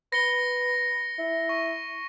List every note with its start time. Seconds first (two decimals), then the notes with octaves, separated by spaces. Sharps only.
0.12 B4 A#6 C#7 G7
1.19 E4
1.49 C#6